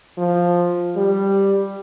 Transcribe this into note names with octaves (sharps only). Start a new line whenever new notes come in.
F3
G3